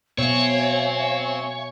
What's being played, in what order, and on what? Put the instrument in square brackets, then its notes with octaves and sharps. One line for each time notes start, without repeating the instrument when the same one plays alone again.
[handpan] B2 [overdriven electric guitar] C4 [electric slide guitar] C#5 [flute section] E5 F5 G#5